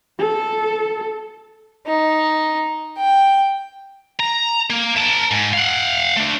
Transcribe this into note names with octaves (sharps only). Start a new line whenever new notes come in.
A4
D#4
G5
A#5
A#3
A#4 A5
G#2
F5 F#5
A3 D4